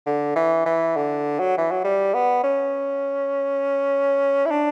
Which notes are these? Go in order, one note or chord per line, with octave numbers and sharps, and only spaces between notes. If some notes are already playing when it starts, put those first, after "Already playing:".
D3
E3
E3
D3
F#3
E3
F#3
G3
B3
C#4
E4
D4